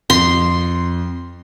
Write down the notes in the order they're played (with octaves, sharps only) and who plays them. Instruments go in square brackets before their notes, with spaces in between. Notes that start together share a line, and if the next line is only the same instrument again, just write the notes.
[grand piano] F2 [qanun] C6